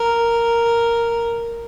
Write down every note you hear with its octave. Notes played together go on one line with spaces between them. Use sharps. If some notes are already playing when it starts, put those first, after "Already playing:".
Already playing: A#4